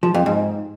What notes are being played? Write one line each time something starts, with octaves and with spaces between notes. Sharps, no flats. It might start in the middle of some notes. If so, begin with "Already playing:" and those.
F3
F2
G#2